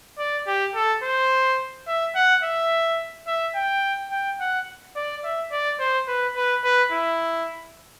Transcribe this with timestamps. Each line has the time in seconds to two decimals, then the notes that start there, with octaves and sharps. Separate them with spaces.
0.18 D5
0.47 G4
0.75 A4
1.03 C5
1.87 E5
2.15 F#5
2.43 E5
3.27 E5
3.55 G5
4.11 G5
4.40 F#5
4.96 D5
5.24 E5
5.51 D5
5.79 C5
6.08 B4
6.36 B4
6.64 B4
6.92 E4